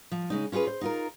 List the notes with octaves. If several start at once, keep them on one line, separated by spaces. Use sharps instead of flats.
F3
C#3 G#3 D#4
C#4 F4 G4 G#4 B4
C5
D#4 F4 A#4